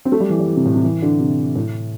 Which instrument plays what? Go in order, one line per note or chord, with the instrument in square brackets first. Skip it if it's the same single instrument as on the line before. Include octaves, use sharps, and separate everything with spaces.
[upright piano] C4
A3
G3
E3
G3
E3
C3
A2
C3
E3
D3
C3
A2